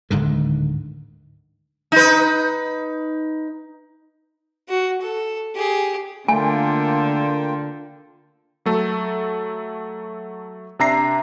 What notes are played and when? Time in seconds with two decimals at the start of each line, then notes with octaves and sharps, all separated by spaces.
0.10 D1 G#2 D3 D#3
1.92 D#4 B4
4.69 F#4
5.02 A4
5.55 G4 G#4
6.28 D3 A3 A#3 F4 G5 G#5
8.66 F#3 A3 A4
10.79 C3 D4 E5 A#5 A#6 C7